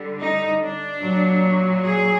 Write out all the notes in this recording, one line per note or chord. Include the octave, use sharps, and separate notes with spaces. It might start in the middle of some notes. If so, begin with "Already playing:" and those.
Already playing: D3 G3
D#4
D4
A#2 F#3
G#4